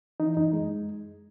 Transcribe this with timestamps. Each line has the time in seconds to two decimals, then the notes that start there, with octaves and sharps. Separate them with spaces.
0.20 E3 D#4
0.37 F#2 D#4
0.53 G#3